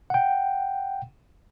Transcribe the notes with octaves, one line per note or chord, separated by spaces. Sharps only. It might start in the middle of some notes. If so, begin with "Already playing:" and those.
F#5 G5